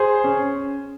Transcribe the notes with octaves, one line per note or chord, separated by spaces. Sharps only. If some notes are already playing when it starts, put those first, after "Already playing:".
Already playing: G#4 C5
C#4